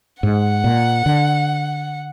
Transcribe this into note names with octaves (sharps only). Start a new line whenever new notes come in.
G#2 F#5
A#2
D3